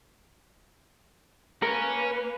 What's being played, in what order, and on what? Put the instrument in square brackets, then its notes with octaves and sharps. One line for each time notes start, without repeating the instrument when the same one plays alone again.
[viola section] A#3 B4 [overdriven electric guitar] C#4 [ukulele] A#4